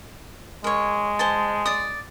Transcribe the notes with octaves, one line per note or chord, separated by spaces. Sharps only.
G#3 A#4 C#5
C5 G#5 A5
D5 D#6